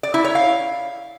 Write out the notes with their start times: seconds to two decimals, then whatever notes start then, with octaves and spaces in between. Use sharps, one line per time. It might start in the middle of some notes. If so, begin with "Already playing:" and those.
0.03 D5
0.14 E4
0.25 C#5
0.35 F5